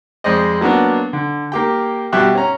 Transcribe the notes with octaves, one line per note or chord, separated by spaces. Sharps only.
F2 G#3 C4 C5 D5 D#5
F#3 A#3 B3 D4
D3
A#3 G4 G5
G2 B2 G4 E5 G5 F#6
C#4 A#5